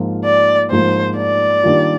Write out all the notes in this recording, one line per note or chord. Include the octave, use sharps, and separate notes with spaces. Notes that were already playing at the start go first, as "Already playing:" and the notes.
Already playing: G#2 F3 A#3 F4
D5
G#2 F3 A#3 F4 C5
D5
D#3 G3 A#3 D4 F4